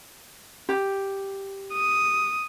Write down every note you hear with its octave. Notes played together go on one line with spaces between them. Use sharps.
G4
D#6